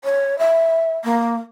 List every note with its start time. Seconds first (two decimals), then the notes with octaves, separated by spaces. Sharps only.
0.04 C#5
0.39 E5
1.04 A#3